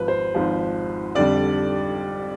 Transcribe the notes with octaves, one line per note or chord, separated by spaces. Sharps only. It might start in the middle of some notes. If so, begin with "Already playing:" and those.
Already playing: G#1 G#2 F3 B4
C5
G#1 G#2 F3
F2 D3 G3 D5